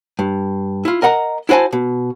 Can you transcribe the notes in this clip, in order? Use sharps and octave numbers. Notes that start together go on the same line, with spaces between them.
G2
E4 F4
A#4 D#5 F#5 A#5
E4 F#4 C5 G#5 A5
B2